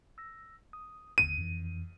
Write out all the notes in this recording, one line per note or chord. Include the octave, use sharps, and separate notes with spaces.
E6 A#6
D#6
G1 D#2 D3 D#7
F2 E3